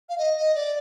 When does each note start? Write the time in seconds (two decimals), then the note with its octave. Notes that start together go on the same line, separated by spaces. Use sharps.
0.09 F5
0.18 D#5
0.37 D#5
0.55 D5